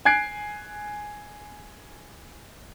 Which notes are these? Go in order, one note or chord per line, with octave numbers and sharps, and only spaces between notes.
G#5 F#6 G#6 C7 D7